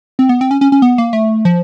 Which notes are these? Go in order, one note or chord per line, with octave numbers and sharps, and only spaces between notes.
C4
B3
C4
C#4
C#4
C#4
B3
A#3
A3
F3